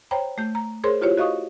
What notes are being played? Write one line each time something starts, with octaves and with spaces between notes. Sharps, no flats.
C5 C#5 G5 A#5 B5
A3 G6
A#5
G#4 A#4 C5 C#5 C6
E4 F4 G4 C5 C#5
F#4 D#5 F5 C#6 D#6